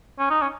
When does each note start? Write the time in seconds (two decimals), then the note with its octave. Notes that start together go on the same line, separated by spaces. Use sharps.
0.19 C#4
0.30 D#4
0.42 C#4